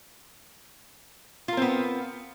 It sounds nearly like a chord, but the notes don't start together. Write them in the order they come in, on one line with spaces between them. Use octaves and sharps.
F4 A#4 C4 B3